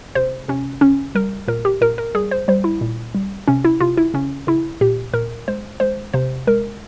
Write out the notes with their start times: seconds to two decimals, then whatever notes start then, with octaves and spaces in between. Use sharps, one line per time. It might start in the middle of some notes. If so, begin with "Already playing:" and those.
0.15 C3 C5
0.48 C3 C#4
0.81 C#3 C#4
1.15 G3 A#4
1.48 A#2 A#4
1.65 G4
1.81 A#2 A#4
1.98 A#4
2.15 G3 G#4
2.31 C5
2.48 G3 C5
2.64 E4
2.81 A#2
3.15 G3
3.48 C3 C#4
3.64 E4
3.80 C3 F4
3.97 E4
4.14 C#3 C#4
4.47 C#3 E4
4.81 A#2 G4
5.13 A#2 A#4
5.48 G#3 C5
5.80 G#3 C5
6.14 C3 C5
6.47 G#3 A#4